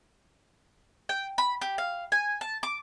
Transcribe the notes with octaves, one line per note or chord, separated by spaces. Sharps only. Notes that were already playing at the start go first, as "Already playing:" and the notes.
G5
B5
G4
F5
G#5
A5
D6